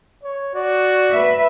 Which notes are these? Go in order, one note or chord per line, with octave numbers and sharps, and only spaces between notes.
C#5
F#4 D5
B4 E5